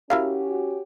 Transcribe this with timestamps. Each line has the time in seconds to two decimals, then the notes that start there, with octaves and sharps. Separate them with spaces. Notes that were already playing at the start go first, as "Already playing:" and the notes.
0.10 C#4 E4 F#4 G4 A#4 F5